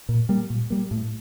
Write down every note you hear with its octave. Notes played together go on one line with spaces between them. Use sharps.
A#2
G3 A#3
A#2
G3 A#3
A2